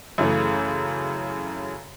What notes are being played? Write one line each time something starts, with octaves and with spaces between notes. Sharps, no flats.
F#2 C#3 E3 A3